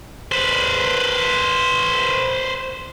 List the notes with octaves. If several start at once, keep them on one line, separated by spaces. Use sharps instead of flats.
B4 C5